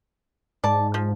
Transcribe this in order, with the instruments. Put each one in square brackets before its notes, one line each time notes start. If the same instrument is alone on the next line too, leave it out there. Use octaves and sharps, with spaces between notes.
[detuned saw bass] G#2 [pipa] D5 A5
[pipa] F3